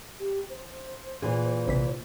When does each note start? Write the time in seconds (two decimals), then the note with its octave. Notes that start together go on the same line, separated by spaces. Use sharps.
0.19 G4
0.50 C5
1.22 A#2 E3 G#4
1.68 A#1 C3 B6